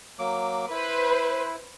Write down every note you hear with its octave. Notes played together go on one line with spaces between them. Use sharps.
F#3 A#3 D6
E4 B4 C5